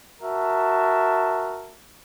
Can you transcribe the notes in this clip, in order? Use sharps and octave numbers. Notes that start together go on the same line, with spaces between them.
F#4 A#4 E5 A5